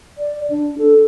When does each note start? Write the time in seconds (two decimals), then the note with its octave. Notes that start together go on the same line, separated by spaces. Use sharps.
0.18 D5
0.50 D4
0.78 A4